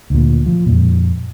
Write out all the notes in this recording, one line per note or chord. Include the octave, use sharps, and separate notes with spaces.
D2 A#2
F3
F2 A#2